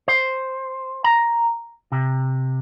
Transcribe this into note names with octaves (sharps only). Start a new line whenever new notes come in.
C5
A#5
C3